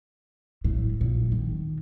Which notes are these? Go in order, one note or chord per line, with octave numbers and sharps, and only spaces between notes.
A2
A#2
D#3